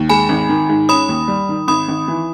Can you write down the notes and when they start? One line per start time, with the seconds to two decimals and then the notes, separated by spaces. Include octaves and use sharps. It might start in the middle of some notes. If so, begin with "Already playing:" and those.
Already playing: D#2
0.09 G#3 G#5 B5
0.29 G#1
0.49 D#3
0.69 G#2
0.89 C#4 B5 D#6
1.09 D#2
1.28 G3
1.49 D#3
1.68 G#1 B5 D#6
1.89 G#1
2.08 E3